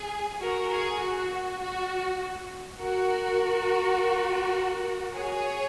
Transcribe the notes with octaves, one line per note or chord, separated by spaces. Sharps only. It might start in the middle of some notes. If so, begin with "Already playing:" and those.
Already playing: G#4
F#4 A#4
G#4
F#4
F#4
F#4 A#4
G#4 C#5